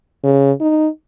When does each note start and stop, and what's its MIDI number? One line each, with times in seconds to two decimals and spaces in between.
0.24 0.52 49
0.61 0.88 63